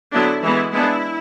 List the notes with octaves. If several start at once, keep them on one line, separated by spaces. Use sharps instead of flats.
D3 F#3 B3 D4 E4
E3 G#3 B3 E4
G#3 B3 D4 E4